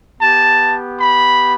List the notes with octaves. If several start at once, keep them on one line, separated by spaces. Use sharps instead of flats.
B3 G4 A5
B5